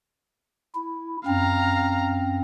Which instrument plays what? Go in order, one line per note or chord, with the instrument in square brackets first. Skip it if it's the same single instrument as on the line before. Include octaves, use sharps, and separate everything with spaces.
[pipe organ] E4
[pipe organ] F#2 C4 [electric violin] F5 A#5